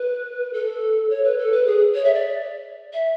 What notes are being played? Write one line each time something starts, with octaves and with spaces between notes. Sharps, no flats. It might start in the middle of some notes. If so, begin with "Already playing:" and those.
Already playing: B4
A4
C#5
B4
A4
B4
G#4
C#5
E5
D5
E5